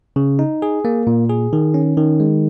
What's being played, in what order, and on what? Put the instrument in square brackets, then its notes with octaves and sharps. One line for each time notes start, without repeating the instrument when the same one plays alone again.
[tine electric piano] C#3
D#4
G#4
A#3
A#2
G#4
D#3
C#4
D#3
G#3